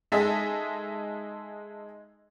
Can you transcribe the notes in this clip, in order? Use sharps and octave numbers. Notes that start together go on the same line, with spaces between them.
G#3 D#4 G#4 A4 D#5 E5